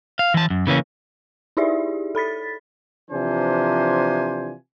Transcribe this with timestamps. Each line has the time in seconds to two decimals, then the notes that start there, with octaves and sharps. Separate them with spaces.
0.19 F5
0.34 E3 A5
0.50 F#2
0.67 C#3 E3 A#3 C#4
1.57 D#4 E4 G4 G#4 D5 E5
2.15 A4 B5 A6 B6
3.10 C3 E3 F3 D4 C5 G#5